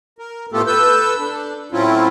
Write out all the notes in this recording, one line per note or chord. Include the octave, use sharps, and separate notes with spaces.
A#4
A2 A3 B3 F4 G4 A4
A4 B4 E6 G6
D4
A2 F#3 C4 C#4 E4 F4